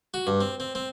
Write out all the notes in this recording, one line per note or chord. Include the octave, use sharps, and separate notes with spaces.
F#4
G2
C4
C4
C4